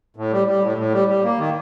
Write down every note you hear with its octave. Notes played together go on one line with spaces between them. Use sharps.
A2
G3
G3
A2
A2
G3
G3
A#3
D#3